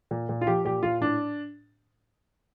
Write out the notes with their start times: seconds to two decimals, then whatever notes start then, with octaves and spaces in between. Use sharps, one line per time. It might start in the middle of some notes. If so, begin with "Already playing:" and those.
0.11 A#2
0.29 A#2
0.41 F4
0.47 F3 G4
0.65 A#2 G4
0.83 A#2 F4
1.01 A2 D4